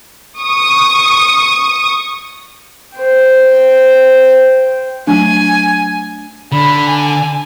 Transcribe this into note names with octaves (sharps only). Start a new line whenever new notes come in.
C#6 D#6
C5 G5
F#3 A3 D4 G#5
D3 B5
G#5